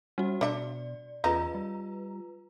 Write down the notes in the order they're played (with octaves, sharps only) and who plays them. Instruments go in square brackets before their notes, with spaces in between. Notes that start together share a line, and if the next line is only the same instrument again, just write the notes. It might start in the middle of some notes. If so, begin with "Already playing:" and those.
[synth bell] G3 F#4 [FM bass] C#4
[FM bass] B2 [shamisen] D4 E5 [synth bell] D5
[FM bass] E2 [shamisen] C#3 D#4 [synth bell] F4 B4 A#5
[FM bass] G3